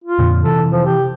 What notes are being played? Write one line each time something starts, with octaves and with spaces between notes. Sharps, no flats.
F4
F2 A#2 D3
C3 E3 A4
F3
G4